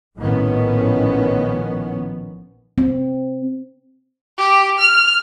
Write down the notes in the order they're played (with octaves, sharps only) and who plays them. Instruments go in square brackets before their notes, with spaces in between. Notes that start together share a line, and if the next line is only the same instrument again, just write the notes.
[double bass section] A#1 A2 D#3 F3 B3 C#4
[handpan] C4
[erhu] G4
F6